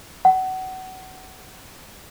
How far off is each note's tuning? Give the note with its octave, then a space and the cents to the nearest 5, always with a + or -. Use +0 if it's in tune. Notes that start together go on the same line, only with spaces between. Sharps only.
F#5 +25